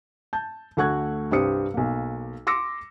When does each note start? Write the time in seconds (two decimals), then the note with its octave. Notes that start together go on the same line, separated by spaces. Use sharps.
0.33 A5 G6
0.77 D2 A3 F#4 C#6 F#6 G#6
1.31 C2 G2 G4 C5 D#6 C#7
1.74 B1 A#3
2.47 C6 D6 E6 A#6 C#7